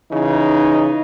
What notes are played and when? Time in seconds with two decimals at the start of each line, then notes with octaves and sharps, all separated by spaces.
0.11 C#3 E3 D#4